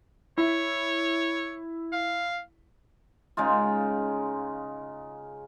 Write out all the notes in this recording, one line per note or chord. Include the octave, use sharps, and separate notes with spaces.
E4 C#5
F5
C#3 G#3 D#4 F4